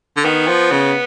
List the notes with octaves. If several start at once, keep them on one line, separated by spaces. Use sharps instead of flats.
D3
D#3 B3
F3
C#3